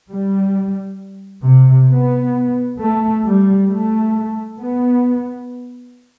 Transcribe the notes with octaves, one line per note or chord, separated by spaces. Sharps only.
G3
C3
B3
A3
G3
A3
B3